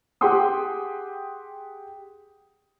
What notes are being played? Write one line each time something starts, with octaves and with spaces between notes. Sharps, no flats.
G4 G#4 F#5 G5 C6 D#6